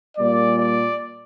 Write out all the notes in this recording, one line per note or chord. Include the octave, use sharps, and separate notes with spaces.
A#2 G3 A#3 D5
D5